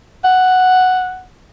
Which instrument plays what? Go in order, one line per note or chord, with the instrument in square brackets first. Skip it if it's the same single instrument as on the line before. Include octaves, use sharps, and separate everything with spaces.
[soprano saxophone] F#5